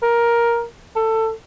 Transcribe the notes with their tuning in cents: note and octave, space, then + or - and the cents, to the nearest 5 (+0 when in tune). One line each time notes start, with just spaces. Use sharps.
A#4 +10
A4 +20